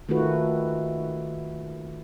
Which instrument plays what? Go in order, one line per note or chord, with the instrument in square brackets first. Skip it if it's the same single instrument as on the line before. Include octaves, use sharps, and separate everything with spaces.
[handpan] D#3 A3 D#4 F4 F#4 B4